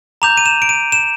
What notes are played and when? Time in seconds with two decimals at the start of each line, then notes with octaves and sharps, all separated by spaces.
0.22 A#5 D6 G6 F7
0.37 D#7
0.46 E7
0.62 D7
0.69 D#7
0.92 E7